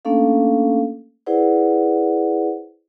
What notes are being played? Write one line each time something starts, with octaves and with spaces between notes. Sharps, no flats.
A3 A#3 C#4 D4 A4 F5
E4 G#4 B4 C5 D5 F#5